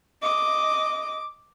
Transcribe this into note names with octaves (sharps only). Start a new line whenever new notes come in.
D#5 D6